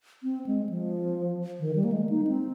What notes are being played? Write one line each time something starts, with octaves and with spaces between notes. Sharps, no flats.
C4
G#3
F3
D#3
G3
A#3
G#3
D#4
C4